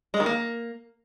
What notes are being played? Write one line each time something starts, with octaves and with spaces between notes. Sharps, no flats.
G#3
D#3
A#3